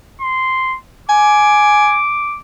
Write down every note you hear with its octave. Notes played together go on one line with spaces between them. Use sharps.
C6
G#5 D6